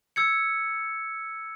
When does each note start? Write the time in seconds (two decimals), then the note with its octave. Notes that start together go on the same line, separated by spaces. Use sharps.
0.16 E6 G#6 C#7